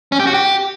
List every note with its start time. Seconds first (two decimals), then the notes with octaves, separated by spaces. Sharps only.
0.12 C#4
0.19 G4
0.27 F#4
0.34 G4